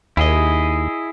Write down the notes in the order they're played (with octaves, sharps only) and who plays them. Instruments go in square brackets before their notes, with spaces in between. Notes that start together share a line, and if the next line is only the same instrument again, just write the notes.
[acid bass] D#2 [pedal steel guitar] E4 G#4 D#5